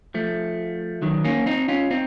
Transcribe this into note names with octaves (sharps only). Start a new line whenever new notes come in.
F3 A3
D#3 F#3
A#3 C#4
C4 D#4
C#4 F4
C4 D#4